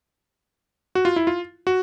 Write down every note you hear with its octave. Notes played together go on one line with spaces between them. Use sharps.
F#4
F4
E4
F4
F#4